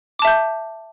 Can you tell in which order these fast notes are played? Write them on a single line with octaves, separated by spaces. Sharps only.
D6 A5 E5 G6